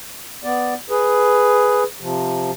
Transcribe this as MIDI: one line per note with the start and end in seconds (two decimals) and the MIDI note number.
0.44 0.74 59
0.44 0.74 74
0.90 1.83 68
0.90 1.83 71
2.00 2.51 48
2.00 2.51 53